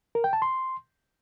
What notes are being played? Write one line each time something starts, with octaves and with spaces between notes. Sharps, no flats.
A#4
G5
A5
C6